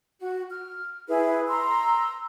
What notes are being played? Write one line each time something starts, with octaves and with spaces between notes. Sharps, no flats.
F#4
F6
E4 G#4 B4
A#5 C6 E6